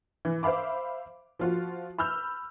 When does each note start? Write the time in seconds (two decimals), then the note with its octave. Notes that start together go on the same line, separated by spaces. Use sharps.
0.25 E3
0.43 C5 E5 F5 B5 D6
1.39 F3 F4 F#4
1.98 B5 E6 F6 G6